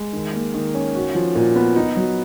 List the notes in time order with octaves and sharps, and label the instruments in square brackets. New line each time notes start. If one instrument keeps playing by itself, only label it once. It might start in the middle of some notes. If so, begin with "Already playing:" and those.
Already playing: [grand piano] G#3
D#3
A#3
D#3
C#4
F#4
F3
A#2
B3
D#4
F#3